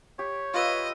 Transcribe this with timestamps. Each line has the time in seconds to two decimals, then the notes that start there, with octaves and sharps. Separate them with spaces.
0.19 G4 C#5
0.54 F4 B4 D#5 E5